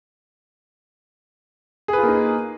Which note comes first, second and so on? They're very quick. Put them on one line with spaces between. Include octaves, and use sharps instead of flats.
G#4 B4 F4 A#3 D#4